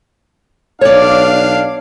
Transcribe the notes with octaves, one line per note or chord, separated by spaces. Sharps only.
B1 D4 C#5 D5 F5